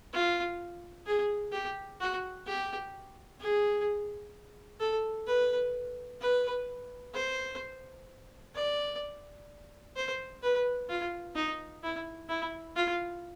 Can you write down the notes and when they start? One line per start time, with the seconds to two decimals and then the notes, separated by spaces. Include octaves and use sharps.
0.13 F4
1.07 G#4
1.53 G4
2.01 F#4
2.47 G4
3.40 G#4
4.80 A4
5.27 B4
6.21 B4
7.14 C5
8.55 D5
9.96 C5
10.43 B4
10.89 F4
11.35 D#4
11.83 E4
12.29 E4
12.76 F4